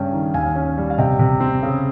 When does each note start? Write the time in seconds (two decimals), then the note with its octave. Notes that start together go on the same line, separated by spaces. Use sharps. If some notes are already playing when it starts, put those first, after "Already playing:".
Already playing: G2 C#3 C#4 G5
0.13 D#3
0.34 D#2 F5 G#5
0.56 C#4
0.77 G3
0.90 F5
0.98 C3 D#5 G5
1.19 C3
1.40 C4
1.63 C#3